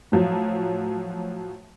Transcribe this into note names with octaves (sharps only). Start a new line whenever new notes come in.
A2 F3 F#3